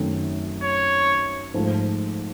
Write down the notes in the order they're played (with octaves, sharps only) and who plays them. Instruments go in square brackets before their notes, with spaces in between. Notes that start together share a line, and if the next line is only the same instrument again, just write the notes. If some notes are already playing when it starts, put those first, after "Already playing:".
Already playing: [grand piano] F#2 D#3 F#3 A3 C4
[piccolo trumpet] C#5
[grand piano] G#2 F3 A3